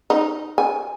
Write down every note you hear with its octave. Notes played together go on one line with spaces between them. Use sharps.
D#4
G#5